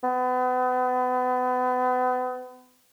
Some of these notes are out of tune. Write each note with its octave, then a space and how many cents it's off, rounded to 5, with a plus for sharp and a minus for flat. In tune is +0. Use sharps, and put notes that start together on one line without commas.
B3 +35